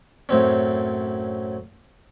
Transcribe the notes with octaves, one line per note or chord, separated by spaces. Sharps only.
F#2 A2 C4 C#4